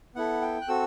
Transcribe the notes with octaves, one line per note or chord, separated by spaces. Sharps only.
B3 E4 A4 F#5
G5
F#6
C4 F#4 A4 E6